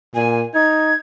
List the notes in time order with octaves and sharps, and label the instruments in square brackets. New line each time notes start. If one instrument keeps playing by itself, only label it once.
[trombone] A#2 [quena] G#5
[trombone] D#4 [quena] G#6